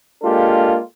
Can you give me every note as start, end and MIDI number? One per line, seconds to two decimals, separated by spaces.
0.23 0.80 56
0.23 0.80 58
0.23 0.80 62
0.23 0.80 65
0.23 0.80 67
0.23 0.80 69